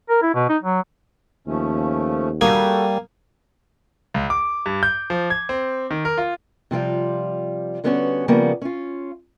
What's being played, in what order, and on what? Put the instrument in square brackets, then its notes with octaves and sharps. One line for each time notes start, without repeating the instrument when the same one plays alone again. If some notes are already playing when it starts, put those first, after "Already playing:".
[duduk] A#4
E4
B2
D#4
F#3
[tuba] D#2 [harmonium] F3 A3 C#4
[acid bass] G3 [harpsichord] A#3 G#5 D#6 [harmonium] F#4 A4 G5
[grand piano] C#2
D6
G2
G6
F3
G#6
C4
D#3
A#4
F4
[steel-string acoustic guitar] C3 F3 G3 F4
D3 G3 B3 C#4 F4 F#4
C#3 F3 G3 A#3 B3
C#4 F4